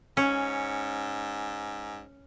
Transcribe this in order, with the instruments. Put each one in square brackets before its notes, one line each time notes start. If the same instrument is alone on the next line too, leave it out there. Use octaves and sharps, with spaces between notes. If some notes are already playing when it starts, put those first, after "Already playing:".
[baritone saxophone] G#2 [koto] C#4